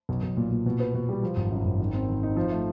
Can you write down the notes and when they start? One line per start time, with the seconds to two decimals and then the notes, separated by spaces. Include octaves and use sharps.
0.09 B1
0.23 B1
0.37 A#2
0.51 A#2
0.66 B2
0.80 B3
0.94 B2
1.09 G3
1.23 F3
1.36 G#1
1.51 F#2
1.65 G#1
1.79 D#3
1.94 C4
2.09 D#3
2.23 D#4
2.36 F3
2.51 A3